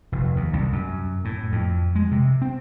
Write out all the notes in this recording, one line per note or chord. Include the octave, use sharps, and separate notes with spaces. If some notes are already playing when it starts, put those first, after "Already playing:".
F1
D#2
C2
F#2
A2
F2
G#3
C3
C4